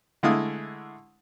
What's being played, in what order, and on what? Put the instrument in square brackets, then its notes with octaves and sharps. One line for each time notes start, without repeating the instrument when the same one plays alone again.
[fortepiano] D3 G#3 A3 E4 F5 D#6